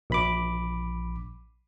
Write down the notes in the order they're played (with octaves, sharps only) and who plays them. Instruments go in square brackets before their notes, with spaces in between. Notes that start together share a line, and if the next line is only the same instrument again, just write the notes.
[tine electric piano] A#1 B5 D6